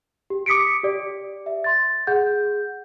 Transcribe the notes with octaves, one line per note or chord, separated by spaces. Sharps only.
G4
D6 D#6 B6 C#7 D7
G4 D5
E5
C6 A6
G#4 F#5 G6